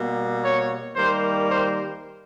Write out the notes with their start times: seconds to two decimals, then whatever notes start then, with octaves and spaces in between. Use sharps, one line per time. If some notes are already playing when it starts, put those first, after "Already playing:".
Already playing: B2 G3 A#3
0.42 C#5
0.95 D#3 G3 A#3 C5
1.49 C5